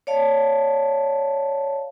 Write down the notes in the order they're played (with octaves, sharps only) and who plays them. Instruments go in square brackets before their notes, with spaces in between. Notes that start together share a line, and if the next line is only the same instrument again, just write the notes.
[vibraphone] C#5 D5 F5 A5